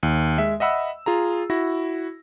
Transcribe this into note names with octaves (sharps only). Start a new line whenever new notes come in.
D#2
G#3 E5
D#5 E5 F#5 B5 E6
F4 G#4 A#5
E4 F#4 A#6